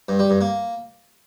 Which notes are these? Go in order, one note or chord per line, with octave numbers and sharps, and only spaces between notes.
G2
G3
G2
A#3